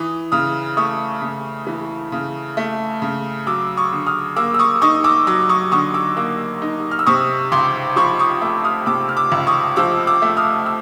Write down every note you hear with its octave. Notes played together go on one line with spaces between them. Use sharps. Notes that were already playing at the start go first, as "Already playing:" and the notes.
Already playing: E3 D#6
C#3 D#6 F6
A3 C#6 D#6
C#3
E3
C#3
A3
C#3
F#3 D6 E6
C#6 D#6
D3
D#6 F6
A#3 D6 E6
E6
C#6 D#6
D#4 C#6 D#6
D6 E6
F#3 D6 E6
C#6 D#6
D3 C#6 D#6
D6 E6
A#3 D6 E6
D#4
F6
E6
C3 C#6 D#6
C#2 C6 D6
F3 B5 C#6
C#6 D#6
A3 D6 E6
D#6 F6
C3 D6 E6
F6
D6 E6
C#2
C#6 D#6
F3 D6 E6
D6 E6
A3
D#6 F6
E6